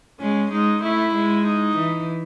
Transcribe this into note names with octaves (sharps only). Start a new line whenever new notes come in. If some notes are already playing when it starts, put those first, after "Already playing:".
G#3 C#4
G#3 D#4
A3 E4
G#3
D#4
E3